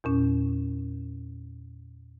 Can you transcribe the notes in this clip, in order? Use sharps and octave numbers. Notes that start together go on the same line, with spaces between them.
E2 A#2 C#4